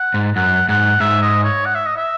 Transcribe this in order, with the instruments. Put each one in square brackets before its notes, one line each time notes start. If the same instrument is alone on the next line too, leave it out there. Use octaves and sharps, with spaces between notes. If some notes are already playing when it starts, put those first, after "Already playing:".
Already playing: [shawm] F#5
[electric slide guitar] G#2
[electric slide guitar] F#2 [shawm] F#5
[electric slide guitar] G#2 [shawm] F#5
[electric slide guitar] G#2 [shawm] E5
[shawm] D#5
C#5
F#5
E5
D#5
E5